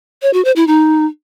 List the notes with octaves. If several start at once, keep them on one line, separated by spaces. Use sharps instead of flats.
C#5
F#4
C5
E4
D#4